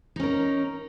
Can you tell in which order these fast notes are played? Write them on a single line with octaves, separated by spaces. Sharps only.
D#4 C#4 A#4